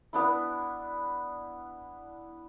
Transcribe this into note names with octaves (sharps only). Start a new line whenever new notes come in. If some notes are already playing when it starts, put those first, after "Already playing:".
B3 D4 E4